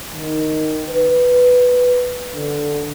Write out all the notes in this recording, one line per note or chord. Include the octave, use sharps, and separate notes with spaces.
D#3
B4
D3